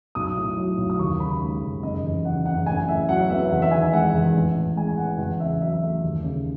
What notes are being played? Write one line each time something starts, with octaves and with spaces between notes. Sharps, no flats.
B1 D#6
A2
F#3
B1
D#6
D#2 C#6
C#3 B5
G#3
D#2
F#1 D#5
E2
C#3 F#5
F#1 F#5
A1 G#5
A2 E5
F#3 F#5
B3 E5
E2 F#5
E5
D#3 G#5
E5
G#3 F#5
E2
A1
A2
G#3 G#5
B3 F#5
E2 F#5
C#3 E5
F#3 E5
A3
D#2
C#3